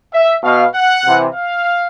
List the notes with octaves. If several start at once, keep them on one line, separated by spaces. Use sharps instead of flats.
E5
B2 F5
F#5
C3 E3
F5